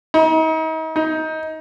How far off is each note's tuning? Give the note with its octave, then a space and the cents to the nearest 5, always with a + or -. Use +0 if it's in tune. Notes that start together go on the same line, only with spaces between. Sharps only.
D#4 +40
D#4 +20